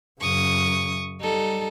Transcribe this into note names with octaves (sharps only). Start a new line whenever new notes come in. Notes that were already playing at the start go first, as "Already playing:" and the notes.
F#2 C#3 C#6 D#6
G3 D#4 A4